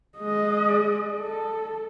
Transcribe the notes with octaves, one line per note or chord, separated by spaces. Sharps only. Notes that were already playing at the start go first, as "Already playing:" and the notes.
G#3 D#5
A4